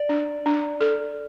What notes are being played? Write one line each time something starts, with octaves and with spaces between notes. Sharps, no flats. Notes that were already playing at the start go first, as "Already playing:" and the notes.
Already playing: D5
D4
D4
A4